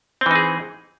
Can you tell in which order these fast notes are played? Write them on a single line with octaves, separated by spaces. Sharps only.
C4 E3 D#4 G#4